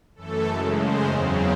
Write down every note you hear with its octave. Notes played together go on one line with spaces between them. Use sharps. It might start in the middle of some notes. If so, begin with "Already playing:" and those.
F#2 E3 A3 A4
F#2 C#3 G#3
F#2 C#3 G#3 C5
E2 C#3 F#3 C4